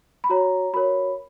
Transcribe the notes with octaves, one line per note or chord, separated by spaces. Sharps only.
B5
F#4 C#5 A#5
F#4 A#4 C#5 B5